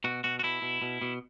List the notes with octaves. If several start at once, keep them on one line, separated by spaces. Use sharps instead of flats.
B2 F#4
B2 F#4
F#4
B2 E4
B2
B2
B2